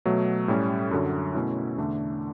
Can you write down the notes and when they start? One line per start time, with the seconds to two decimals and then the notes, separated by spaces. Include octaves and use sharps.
0.05 B2 F#3 A3
0.48 A2 G3 C#4
0.91 F#2 D3 F#3
1.34 B2 A3 C#4 E4
1.77 E2 D3 A3 D4